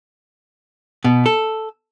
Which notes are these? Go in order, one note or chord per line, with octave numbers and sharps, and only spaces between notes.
B2
A4